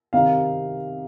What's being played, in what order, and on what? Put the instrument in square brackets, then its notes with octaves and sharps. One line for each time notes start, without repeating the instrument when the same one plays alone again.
[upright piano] C3 D#3 C4 D#4 F5